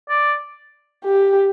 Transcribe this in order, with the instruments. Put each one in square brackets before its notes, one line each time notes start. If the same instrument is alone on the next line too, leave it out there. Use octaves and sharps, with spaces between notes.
[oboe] D5
[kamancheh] G4